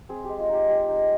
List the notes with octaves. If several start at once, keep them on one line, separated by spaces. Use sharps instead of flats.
C4 G#4
G#3 G4
F4
D#4 G4
G#3 G4
D#4